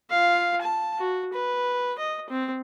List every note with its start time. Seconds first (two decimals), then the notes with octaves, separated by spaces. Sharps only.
0.10 F4 F5
0.62 A5
0.98 F#4
1.33 B4
1.98 D#5
2.30 C4